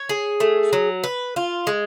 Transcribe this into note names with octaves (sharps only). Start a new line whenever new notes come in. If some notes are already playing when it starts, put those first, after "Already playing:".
Already playing: C#5
G#4
A3
F#3
B4
F4
G#3